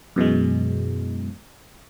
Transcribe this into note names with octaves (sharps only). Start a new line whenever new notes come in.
F#2 B2 E3 G#3